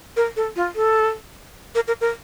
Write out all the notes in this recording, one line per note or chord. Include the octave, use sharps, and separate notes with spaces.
A#4
A4
F4
A4
A#4
A#4
A#4